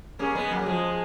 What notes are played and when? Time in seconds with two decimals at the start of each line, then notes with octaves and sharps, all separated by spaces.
0.19 A#3 C#4 G#4
0.35 G#3 B3
0.51 F#3 A#3
0.66 F3 G#3 G#4